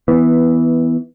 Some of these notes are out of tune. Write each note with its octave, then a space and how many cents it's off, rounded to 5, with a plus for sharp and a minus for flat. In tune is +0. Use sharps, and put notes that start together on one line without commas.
E3 -10 B3 +0